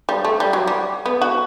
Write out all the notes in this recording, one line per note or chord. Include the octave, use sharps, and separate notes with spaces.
G3
A3
G3
F#3
G3
B3
F#4